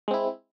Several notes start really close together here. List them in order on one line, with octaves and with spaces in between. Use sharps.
G#3 C4 E4